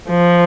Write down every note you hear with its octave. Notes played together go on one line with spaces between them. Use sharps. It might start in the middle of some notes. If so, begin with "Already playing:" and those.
F3